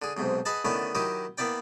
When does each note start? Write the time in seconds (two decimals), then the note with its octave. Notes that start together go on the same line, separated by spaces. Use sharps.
0.02 D3 G#4
0.17 B1 G#2 C3
0.45 G#4 B4 D#5 F#5 A5
0.65 D3 D#3 A3 B3 C#4 E4
0.95 D#3 F#3 E4 G4 D#5
1.38 A#3 B3 E4 D5 G5